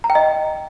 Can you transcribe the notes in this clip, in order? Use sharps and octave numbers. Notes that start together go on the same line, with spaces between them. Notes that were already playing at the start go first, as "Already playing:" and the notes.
A#5
G5
D#5